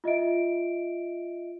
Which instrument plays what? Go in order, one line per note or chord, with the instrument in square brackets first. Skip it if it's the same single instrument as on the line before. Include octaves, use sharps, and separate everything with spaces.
[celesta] F4 D#5 E5 D7